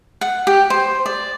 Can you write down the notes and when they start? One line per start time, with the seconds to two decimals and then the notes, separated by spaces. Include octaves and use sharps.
0.21 F#5
0.47 G4
0.70 C5
1.06 D5